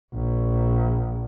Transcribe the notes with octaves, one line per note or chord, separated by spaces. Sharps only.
A#1